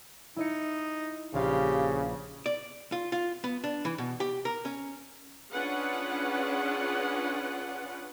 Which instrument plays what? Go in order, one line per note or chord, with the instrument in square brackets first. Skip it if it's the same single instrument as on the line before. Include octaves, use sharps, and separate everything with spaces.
[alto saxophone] D#4 [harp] E4 D#5 C#7
[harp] A#1 F5 [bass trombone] C#3 [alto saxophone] G4
[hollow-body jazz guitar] D5
F4
F4
B3
D4
E3
B2
G4
A#4
C#4
[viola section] C#4 D4 F4 G#4 B4 F#5